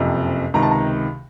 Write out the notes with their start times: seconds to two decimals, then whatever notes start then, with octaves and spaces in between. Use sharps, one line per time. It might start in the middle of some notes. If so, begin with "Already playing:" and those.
Already playing: F#1 F2 C3
0.54 C#2 C3 D#3 A#5
0.62 A5
0.71 A#5